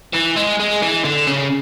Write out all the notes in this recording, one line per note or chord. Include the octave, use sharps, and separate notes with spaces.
E3
G#3
G#3
E3
D3
C#3